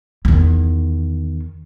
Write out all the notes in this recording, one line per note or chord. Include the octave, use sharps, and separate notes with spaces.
E2 D#3